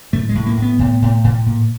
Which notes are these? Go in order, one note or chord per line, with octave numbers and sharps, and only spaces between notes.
A2 A3
G#3
A2
A#3
A2
B3
A2
A2
A2
A#2